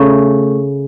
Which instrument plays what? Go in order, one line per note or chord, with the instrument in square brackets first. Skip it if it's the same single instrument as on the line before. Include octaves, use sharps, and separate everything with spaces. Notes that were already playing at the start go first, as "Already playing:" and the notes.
Already playing: [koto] C#3 A3